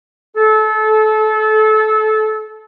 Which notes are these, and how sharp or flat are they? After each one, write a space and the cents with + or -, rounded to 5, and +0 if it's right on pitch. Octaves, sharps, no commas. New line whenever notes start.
A4 -25